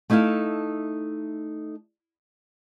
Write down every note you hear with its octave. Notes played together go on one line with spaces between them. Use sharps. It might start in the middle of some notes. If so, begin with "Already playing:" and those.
A3 D#4 E4 A4 F5